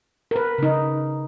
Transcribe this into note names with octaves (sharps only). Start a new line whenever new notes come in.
A#4 B4
C#3 D#4